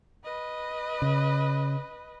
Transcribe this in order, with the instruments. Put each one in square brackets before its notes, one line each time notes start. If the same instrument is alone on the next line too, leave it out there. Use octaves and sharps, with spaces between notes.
[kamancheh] B4 D#5
[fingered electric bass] C#3